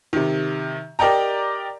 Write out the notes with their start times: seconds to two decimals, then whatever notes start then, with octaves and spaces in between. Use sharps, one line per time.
0.13 C3 D#3
0.99 G4 A#4 D5 D#5 G5 A#5